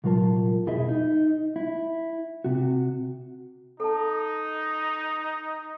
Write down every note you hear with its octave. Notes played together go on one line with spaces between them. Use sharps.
C2 A#2 F#3 F4 A#4 A5
F2 B2 E4 G#4 D#5 E5
D#4
E4
C3 F#4
D#4 A4 A5